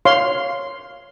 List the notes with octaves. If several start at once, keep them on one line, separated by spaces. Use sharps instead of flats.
C#5 F5 C6